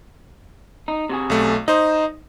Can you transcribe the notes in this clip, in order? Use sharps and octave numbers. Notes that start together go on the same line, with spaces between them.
D#4
C3 F#4 G#4
B1 A3
D#4 C5 D#5